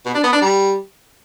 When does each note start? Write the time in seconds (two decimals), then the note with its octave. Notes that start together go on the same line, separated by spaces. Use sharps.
0.05 B2
0.14 D4
0.23 B3
0.32 D4
0.41 G3